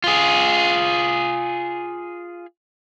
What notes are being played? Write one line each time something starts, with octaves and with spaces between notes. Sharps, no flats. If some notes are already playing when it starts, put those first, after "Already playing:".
F4 G#4